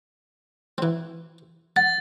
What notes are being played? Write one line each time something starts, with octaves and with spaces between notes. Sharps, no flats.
E3 C4
F#5 A6